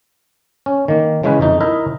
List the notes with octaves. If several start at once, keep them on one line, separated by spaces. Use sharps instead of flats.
C#4
D#3 A#3
C#3 E3 G#3 C#4 G#4 B4
F2 D#4
D#4 E4 A#4 D#5 E5